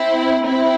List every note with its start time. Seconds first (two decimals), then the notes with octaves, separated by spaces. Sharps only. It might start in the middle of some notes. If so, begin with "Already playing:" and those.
Already playing: C4 E4
0.45 C4 E4